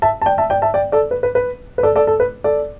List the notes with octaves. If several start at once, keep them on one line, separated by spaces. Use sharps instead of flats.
E5 A5
A5
D5 G5
E5 A5
D5 G5
E5 A5
D5 G5
A4 D5
B4
B4
B4
B4
A4 D5
A4 D5
A4
B4
A4 D5